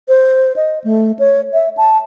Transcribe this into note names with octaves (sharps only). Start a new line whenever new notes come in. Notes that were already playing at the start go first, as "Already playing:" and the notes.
C5
D#5
A3
C#5
E5
A5